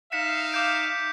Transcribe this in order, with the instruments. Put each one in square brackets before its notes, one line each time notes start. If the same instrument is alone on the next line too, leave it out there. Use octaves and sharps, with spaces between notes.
[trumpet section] D#4 E5 F5 [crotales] B6 C#7 E7
[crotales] D6 G6 D7